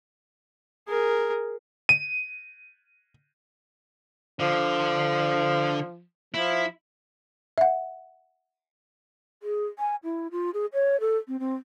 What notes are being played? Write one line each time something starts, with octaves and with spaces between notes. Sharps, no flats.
G#4 A#4
D#7
D3 F3
F3 E4
E5 F#5
G#4
G#5
E4
F4
G#4
C#5
A4
C4
C4